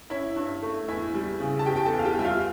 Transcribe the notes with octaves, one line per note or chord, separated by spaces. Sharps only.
C#4 E4 E5
G2
A3
E2 E4 E5
G3
C#3
A5
E2 G4 G5
G5
A4 A5
E2
F5
G4 G5
G3 E5
F4 F5